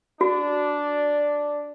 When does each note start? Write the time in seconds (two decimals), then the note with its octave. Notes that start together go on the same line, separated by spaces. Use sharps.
0.21 D4 F#4